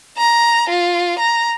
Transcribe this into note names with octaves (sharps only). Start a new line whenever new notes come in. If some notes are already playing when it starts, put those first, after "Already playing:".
A#5
F4
A#5